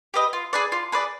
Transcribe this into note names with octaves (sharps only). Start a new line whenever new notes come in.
G4 B4 D#5
F4
G#4 B4 D5
F4
G#4 B4 D5